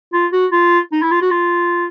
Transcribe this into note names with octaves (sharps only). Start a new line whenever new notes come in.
F4
F#4
F4
D#4
E4
F4
F#4
F4